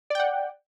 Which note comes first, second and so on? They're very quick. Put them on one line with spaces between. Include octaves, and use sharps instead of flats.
D5 G5 F#5